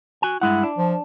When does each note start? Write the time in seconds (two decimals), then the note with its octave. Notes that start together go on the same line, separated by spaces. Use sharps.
0.22 F#4 G#5
0.41 G2 G#3 E4 F#5
0.63 D4
0.77 F3